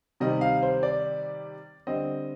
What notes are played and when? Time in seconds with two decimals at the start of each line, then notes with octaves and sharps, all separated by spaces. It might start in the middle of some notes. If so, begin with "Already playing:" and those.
0.20 C3 D#3 G3 C4 D#5
0.41 F5
0.63 C5
0.83 D5
1.87 D3 G3 C4 D#5